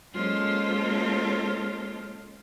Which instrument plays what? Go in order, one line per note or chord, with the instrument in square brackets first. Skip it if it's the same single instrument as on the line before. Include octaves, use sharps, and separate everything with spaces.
[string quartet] G#3 A#3 C#4 F4 A4 C5